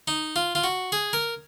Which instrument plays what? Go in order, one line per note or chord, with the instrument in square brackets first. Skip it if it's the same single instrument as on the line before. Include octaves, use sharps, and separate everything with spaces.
[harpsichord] D#4
F4
F4
F#4
G#4
A#4